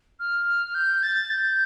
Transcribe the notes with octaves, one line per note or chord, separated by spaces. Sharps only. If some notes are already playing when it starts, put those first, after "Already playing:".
F6
G6
A6
G6